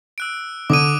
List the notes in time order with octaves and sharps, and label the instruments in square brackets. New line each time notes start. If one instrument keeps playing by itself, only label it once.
[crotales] E6 F#6 D7
[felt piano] D3 [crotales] D6 D#6 D#7